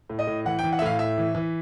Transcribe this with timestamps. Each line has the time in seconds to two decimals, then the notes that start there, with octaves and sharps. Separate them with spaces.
0.10 A2
0.19 D#5
0.27 A2
0.45 E3 F#5
0.59 G5
0.64 E3
0.72 F#5
0.79 E5
0.82 A2 F5
0.99 A2 E5
1.18 E3
1.35 E3